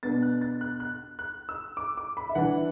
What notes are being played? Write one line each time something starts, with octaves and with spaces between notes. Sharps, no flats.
B2 B3 D4 A6
F#6
A6
F#6
F#6
F#6
E6
D6
D6
B5
E5
E3 D4 F#5